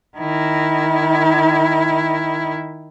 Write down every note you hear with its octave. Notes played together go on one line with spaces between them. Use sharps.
D#3 E4